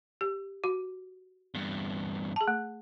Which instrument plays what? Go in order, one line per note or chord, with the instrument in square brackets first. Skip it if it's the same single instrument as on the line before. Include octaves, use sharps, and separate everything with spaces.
[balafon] G4
F#4
[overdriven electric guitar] E2 G2
[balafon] G#4 A5
A3